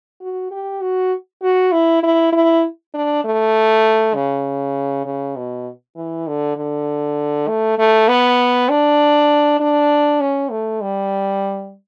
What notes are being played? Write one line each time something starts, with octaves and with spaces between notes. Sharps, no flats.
F#4
G4
F#4
F#4
E4
E4
E4
D4
A3
C#3
C#3
B2
E3
D3
D3
A3
A3
B3
D4
D4
C#4
A3
G3